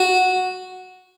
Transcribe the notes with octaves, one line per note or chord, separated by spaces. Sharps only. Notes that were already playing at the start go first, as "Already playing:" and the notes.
Already playing: F#4